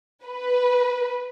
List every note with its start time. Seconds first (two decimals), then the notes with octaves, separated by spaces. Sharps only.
0.25 B4